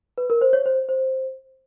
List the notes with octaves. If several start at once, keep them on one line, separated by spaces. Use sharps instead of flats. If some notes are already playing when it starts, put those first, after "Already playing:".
B4
A#4
C5
C#5
C5
C5